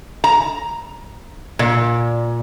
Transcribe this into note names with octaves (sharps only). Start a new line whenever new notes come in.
A#5
A#2